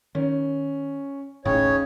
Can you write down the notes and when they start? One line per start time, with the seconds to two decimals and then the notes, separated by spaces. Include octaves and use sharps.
0.15 D#3 C#4
1.45 D#1 A1 A2 C#3 D#4 C#5 G5